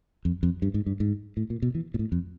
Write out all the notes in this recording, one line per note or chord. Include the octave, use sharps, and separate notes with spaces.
F2
F2
G2
G#2
G2
G#2
A2
A#2
B2
E3
A#2
A2
F2